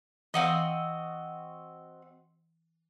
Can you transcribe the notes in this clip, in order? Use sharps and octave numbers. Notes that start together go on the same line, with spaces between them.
E3 C4 F#4 D#5 F5